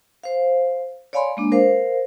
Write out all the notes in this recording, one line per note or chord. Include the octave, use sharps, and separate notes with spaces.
C5 F5
C#5 D5 F5 G#5 B5 C6
G#3 A#3 D4
A#4 C5 F5